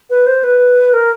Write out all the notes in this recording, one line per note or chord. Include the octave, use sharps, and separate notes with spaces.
B4
C5
B4
A#4